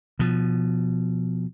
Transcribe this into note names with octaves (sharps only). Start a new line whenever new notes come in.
B2 F3